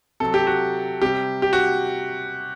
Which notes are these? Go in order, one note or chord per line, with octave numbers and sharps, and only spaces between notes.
C3 F#3 A4
G4
F#4
C3 G3 G4
G4
F#4